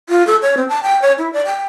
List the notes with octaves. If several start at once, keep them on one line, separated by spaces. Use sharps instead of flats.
F4
A4
C#5
C4
A5
G5
C#5
E4
D5
G5